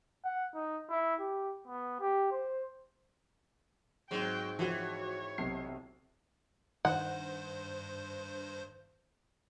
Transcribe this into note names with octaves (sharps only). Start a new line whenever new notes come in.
F#5
D#4
E4
G4
B3
G4
C5
G#2 F#3 C4 G5
E3 F3 F#4 C#5
B1 C3 C7
G2 D#3 C5 F#5